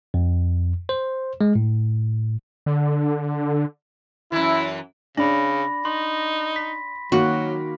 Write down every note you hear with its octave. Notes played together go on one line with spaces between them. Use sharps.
F2
C5
G#3
A2
D3
F#2 E3 E4
C#3 D4 B5 A#6
D#4 C6
B6
D#3 F#3 A#3 F#4